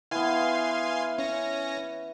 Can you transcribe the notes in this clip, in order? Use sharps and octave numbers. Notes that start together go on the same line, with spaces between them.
E3 B3 F5 G#5 C6
C#4 A#6